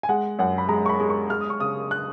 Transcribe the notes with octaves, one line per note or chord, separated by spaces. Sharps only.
G#5
G#3 F#5
F#2 F#5
B5
G#3 A#5
C#6
B5
G#3
C#6
G#3 F6
D#6
C#6
C#3 D#6
F#6